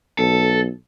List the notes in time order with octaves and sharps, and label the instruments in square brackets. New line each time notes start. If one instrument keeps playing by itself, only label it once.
[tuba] B1 [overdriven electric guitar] A4